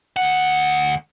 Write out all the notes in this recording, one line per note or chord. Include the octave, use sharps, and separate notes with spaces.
D2 F#5